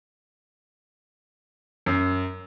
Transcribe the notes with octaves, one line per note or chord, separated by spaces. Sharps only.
F#2